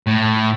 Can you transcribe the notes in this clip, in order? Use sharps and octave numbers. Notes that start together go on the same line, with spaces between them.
A2